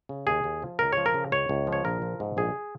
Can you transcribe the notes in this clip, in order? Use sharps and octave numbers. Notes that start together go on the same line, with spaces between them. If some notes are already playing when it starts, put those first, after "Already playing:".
C#3
D#2 G#4
D#2
F3
C#2 A#4
F3 C#5
A#4
C#3
C#2 C#5
C#2
F3
C#5
A#1 A#4
F3
G#2
A#1 G#4